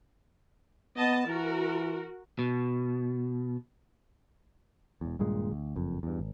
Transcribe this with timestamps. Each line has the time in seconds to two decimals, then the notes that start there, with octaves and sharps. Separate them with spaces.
0.97 B3 D#5 A5
1.27 E3 F#4 A#4
2.39 B2
5.01 E1 E2
5.19 D#1 G2 A#2 G#3
5.51 D2
5.76 F#1 F2
6.03 E2 G2
6.19 G#1